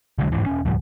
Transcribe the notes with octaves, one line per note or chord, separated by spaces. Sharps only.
C2 D3 F#3 G#3
F1 C#2 G#2 E3
E1 C#4
D2 A2 F3 G3